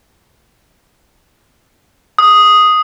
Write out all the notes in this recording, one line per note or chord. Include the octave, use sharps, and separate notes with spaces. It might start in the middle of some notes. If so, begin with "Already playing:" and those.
D#6